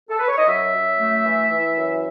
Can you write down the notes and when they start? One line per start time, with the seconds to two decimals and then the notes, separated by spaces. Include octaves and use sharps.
0.09 A4
0.19 B4
0.28 C#5
0.38 D#5
0.48 F#2 E5
0.74 F#2
0.99 A3
1.25 E3
1.50 E3
1.77 F#2